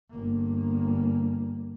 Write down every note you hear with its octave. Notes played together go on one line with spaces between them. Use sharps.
G1 A#3